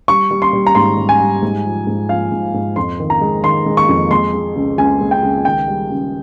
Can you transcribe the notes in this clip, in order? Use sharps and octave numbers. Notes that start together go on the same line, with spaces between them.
G3 C#6
G3
C6
G3
A#5
G#2 C6
G3
G#5
G3
G#2
F3
G#2
F3 F5
G#2
G#2
F2 C6
D#3
A#5
G#3
D#3 C6
G#3
C#6
F2
G#3 C6
G#3
C#2
C#2 G#5
G#3
G5
C#2
D#3 G5
G3
C#2